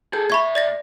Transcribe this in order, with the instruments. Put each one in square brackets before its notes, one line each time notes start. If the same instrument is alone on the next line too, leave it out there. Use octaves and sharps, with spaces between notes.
[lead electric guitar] G#4 A4 [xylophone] G6
[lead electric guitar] A#2 E5 [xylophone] B5 C#6 G#6
[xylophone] D5 A6 A#6